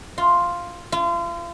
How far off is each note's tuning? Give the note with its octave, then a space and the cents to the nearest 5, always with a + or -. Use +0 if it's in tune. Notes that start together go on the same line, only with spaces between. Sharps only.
F4 +0
F4 -35